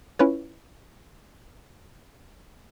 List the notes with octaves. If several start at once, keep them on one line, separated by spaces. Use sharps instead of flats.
C#4 E4 F4 B4 C#5